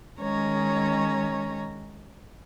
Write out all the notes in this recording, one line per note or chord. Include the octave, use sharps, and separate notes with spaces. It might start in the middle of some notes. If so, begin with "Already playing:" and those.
D#3 G#3 C#4 C#5 A#5